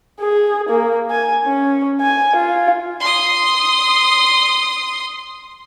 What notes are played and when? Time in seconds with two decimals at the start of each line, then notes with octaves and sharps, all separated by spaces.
0.20 G#4
0.69 A#3
1.11 G#5
1.45 C#4
2.01 G#5
2.36 F4
3.00 C6 D#6